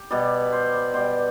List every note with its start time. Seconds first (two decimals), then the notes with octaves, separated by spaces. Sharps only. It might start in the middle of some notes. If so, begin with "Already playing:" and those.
Already playing: G4
0.11 B2 G3 D5
0.52 C5
0.74 D5
0.94 B2 G3 C5